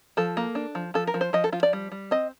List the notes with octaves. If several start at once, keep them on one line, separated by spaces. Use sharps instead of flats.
F3 A4
A#3
D4
F3
F3 A4
A#4
F3
C5
F3 D#5
A4
F3 F4
D5
G3
G3
C4 D#5